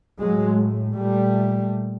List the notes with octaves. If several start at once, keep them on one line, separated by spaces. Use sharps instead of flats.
A2 F#3 G#3
A#2 G3 A3